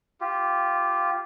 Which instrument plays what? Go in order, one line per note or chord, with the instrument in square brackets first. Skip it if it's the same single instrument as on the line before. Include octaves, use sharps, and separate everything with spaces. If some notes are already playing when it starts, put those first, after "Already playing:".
[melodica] F4 G4